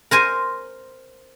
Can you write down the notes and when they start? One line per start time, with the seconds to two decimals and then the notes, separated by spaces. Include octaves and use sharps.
0.11 A#4 C5 G#5